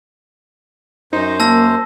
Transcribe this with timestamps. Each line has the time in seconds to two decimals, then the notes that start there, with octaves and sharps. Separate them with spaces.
1.13 F#2 D#4 C5
1.40 A#3 A5 E6 A#6